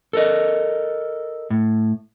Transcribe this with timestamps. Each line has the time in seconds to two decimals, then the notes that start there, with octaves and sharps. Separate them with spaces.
0.13 A4 A#4 D#5
1.50 A2